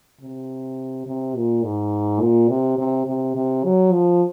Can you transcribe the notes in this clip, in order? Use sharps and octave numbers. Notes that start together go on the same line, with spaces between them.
C3
C3
A#2
G#2
A#2
C3
C3
C3
C3
F#3
F3